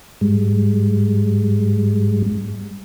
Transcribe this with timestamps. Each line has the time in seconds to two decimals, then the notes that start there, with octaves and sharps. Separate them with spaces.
0.21 G#2 G3 G#3